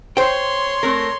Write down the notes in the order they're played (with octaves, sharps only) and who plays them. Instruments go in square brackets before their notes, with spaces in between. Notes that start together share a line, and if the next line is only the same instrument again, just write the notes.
[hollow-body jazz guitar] C5 G5 [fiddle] C#5 C6
[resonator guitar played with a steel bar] A3 C4 A#4